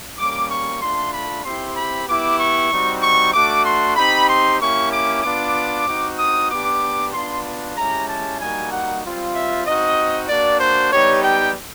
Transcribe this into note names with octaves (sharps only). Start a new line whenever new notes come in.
G3 A#3 C#4 D6
C#6
A3 D4 F4 C6
B5
C4 E4 G4 C6
B5
B3 E4 G4 D6
C#6
G3 C4 D#4 F#4
C#6
A3 D4 F#4 D6
C6
C4 D#4 G4 B5
C6
A#3 C#4 E4 G4 C#6
D6
B3 D4 F4 D6
C4 D#4 F#4
D#6
B3 D4 G4 D6
B3 D4 F4 C6
G#3 C#4 E4 G4 A#5
A5
G3 A#3 D#4 F#4 G#5
F#5
G3 C4 F4
E5
C4 D#4 F#4 D#5
A#3 D4 F#4 D5
C5
G3 B3 D#4 G4 C#5
G5